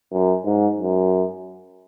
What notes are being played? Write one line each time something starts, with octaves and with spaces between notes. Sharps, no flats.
F#2
G#2
F#2